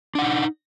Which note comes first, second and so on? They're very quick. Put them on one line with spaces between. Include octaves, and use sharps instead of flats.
D4 F#5 D#4